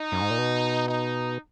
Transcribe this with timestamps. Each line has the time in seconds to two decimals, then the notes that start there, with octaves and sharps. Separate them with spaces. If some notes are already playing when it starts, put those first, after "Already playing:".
Already playing: D#4
0.12 F#2
0.21 G#2
0.30 A#2
0.38 B2
0.87 D#4